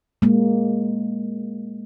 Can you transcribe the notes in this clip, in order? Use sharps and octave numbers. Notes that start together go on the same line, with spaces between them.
G#3 A#3